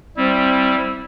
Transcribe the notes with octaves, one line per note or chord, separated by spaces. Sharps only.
G3 C4 E4